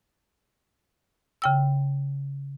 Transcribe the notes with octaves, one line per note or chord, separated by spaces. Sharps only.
C#3 G5 E6